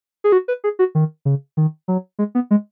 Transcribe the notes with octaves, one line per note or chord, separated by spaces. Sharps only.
G#4
F#4
B4
G#4
F#4
D#3
C#3
D#3
F#3
G#3
B3
G#3